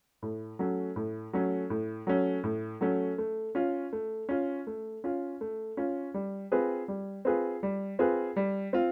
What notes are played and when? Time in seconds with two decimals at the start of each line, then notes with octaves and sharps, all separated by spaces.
0.22 A2
0.59 F#3 A3 C#4
0.96 A2
1.33 F#3 A3 C#4
1.70 A2
2.07 F#3 A3 C#4
2.44 A2
2.81 F#3 A3 C#4
3.18 A3
3.55 C#4 F4
3.93 A3
4.29 C#4 F4
4.67 A3
5.04 C#4 F4
5.41 A3
5.77 C#4 F4
6.14 G3
6.52 C4 F4 G#4 B4
6.88 G3
7.25 C4 F4 G#4 B4
7.63 G3
7.99 C4 F4 G#4 B4
8.36 G3
8.73 C4 F4